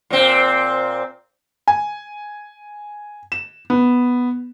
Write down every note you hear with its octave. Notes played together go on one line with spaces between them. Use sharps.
A#2 C4
G#5
E7
B3